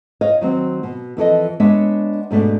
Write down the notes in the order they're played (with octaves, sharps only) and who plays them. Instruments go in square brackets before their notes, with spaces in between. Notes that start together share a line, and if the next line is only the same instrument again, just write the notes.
[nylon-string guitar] C#5 D#5 F5
D#3 F#3 C4
B2
F2 E3 A4 D#5
G#3 B3 D4 C#5 E5
G#2 B2 A3 D4